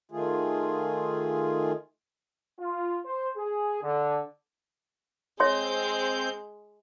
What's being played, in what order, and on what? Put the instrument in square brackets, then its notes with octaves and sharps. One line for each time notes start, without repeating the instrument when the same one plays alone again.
[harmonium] D#3 A3 F4 G#4
[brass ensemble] F4
C5
G#4
D3
[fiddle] G#3 [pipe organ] C4 G6 [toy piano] C#5 E5 C6